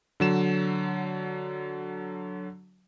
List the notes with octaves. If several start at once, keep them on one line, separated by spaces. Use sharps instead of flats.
D3 F#3 E7